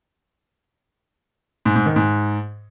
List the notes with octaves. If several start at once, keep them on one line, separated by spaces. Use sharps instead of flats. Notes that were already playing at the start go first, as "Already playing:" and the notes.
G#2
G#2
D#3
G#2